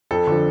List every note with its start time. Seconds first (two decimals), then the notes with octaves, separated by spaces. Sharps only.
0.11 F2 A4
0.27 D3 F3